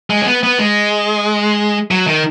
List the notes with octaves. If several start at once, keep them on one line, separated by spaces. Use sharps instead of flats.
G#3
C#4
B3
B3
G#3
F#3
D#3